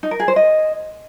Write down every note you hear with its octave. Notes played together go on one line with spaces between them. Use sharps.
D#4
A#4
G#4
C5
D#5